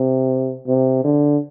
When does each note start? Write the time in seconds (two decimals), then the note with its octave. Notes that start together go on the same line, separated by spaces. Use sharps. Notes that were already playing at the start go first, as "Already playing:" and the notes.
Already playing: C3
0.67 C3
1.04 D3